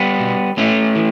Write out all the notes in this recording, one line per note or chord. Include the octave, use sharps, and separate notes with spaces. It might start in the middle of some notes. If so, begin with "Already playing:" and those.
Already playing: G3 B3
B2
A2 A3 C#4
E3